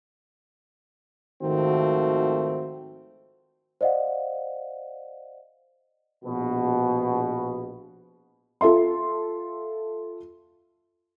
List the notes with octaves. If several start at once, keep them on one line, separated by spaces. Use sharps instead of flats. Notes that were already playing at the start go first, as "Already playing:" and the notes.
G#1 D#3 F3 A3 C4 F#4
C5 D5 D#5 F5 F#5
A#1 B2
F4 A4 E5 C6